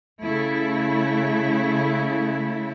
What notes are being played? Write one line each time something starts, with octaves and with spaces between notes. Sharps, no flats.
C#3 A3 E4